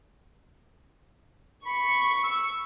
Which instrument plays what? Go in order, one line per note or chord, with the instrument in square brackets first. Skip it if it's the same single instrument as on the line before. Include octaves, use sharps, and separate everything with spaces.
[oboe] B5 [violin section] C#6
[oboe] E6